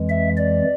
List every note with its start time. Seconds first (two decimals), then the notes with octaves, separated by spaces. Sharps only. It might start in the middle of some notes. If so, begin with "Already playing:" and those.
Already playing: F2 E3 G#3
0.09 E5
0.37 D5